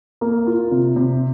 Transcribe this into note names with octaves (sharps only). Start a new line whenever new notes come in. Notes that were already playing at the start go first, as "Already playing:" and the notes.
A#3
F4
C3
C3